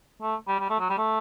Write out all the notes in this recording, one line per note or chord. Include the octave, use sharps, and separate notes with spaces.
A3
G3
G3
A3
F#3
G3
A3